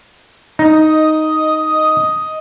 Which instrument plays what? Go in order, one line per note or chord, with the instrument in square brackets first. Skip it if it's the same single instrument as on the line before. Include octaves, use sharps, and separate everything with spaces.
[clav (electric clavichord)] D#4 [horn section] D#5